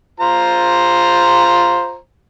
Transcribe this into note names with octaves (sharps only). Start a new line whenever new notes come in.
F4 C5 A#5